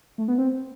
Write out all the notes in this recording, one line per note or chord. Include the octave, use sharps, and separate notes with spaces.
A3
B3
C4